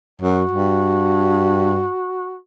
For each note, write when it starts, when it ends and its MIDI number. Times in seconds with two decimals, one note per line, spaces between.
0.21 0.44 42
0.21 2.36 66
0.51 1.86 43